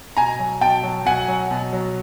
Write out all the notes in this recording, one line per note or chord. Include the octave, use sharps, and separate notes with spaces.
B2 G#5 A#5
F#3
B2 G5 A5
F#3
B2 F#5 G#5
F#3
B2
F#3